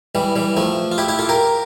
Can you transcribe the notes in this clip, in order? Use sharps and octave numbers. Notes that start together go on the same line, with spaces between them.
E3 G3
E3 G3
F3 A3
F4
E4 G4
E4 G4
F4 A4
G4 A#4